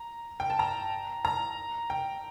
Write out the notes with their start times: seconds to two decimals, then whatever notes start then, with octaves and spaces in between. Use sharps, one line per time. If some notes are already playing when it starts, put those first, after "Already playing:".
Already playing: A#5
0.40 G5
0.50 A5
0.59 A#5
1.25 A#5
1.90 G5